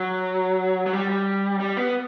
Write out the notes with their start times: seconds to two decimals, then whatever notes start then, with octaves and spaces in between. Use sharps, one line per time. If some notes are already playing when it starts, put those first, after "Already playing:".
Already playing: F#3
0.86 F#3
0.93 G3
1.10 G3
1.60 G3
1.77 B3